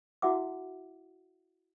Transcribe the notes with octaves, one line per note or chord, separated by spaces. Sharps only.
E4 F#4 E5 F#5 D6